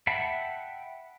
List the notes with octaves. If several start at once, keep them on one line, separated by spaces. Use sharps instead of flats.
E5 F#5 G5 A5 B5